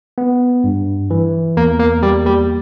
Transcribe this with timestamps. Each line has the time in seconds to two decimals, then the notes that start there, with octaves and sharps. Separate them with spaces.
0.18 B3
0.64 G2
1.10 E3
1.57 E2 A#3
1.79 A#3
2.03 G3 A#3
2.26 G3